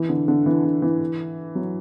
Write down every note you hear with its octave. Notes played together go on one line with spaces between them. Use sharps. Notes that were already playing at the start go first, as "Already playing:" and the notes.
Already playing: E3
D3
D3
E3
D3
E3
F#3